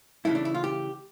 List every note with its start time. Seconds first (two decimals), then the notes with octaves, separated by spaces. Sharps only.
0.25 C#3 E3 A3 E4
0.35 D4
0.45 E4
0.54 F4
0.64 G4